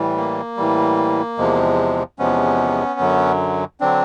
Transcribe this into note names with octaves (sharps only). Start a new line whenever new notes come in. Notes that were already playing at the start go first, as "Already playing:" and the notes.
Already playing: A2 E3 G3
A#3
A2 E3 G3
E2 C3 F3 G#3
E2 C3 F3 G#3 B3 C#4
F#2 D3 F#3
D3 F#3 C4 D4